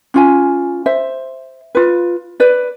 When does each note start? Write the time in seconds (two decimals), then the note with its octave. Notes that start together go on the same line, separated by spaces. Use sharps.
0.14 C#4 F4 G#5
0.86 C5 E5
1.75 F4 B4
2.40 B4 D5